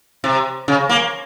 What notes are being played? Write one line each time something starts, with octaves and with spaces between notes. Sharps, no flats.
C3
C#3
A#3